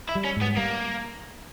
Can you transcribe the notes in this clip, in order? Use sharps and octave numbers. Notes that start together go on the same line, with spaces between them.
E4
G3
C#4
G#2 B3
G3 A#3